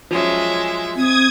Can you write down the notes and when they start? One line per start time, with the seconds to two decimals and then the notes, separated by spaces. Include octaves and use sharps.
0.11 F3 F#3 G#3 C#4 E5
0.96 C4 D#6 G#6